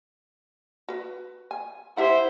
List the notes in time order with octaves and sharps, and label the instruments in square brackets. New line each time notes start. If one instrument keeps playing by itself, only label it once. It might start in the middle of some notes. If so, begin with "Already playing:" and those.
[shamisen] F#4 B4
G#5
[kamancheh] E4 C5 [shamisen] G4 E5 F#5